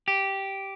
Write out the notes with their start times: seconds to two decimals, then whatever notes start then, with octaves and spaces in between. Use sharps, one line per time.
0.08 G4